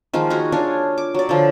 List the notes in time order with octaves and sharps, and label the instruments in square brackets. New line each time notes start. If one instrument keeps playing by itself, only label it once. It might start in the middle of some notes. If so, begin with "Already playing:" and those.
[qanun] D#3 F3 G#3 A#3
D#4 F#4 G#4
D4 F4 G#4 C#5
D6
F#3 D5
D3 F3